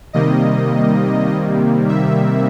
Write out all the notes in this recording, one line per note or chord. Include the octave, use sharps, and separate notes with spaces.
C3 D#3 G3 A#3 D#5
E5